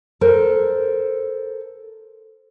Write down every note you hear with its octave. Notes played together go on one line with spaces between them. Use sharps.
A4 A#4 C5